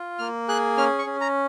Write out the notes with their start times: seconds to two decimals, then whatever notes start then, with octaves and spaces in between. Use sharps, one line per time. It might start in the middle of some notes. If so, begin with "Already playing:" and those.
Already playing: F4
0.19 A#3 F6
0.48 G#4 F#6
0.77 C#4 F6
0.99 C#6
1.06 C#4
1.21 A#5